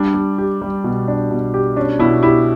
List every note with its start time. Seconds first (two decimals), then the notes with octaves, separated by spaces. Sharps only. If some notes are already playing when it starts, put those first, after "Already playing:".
Already playing: G3 D4
0.14 G3
0.38 G4
0.62 G3
0.84 B2
1.08 D4
1.31 B2
1.54 G4
1.76 C#4 D4
1.99 B2 E4
2.22 E4 G4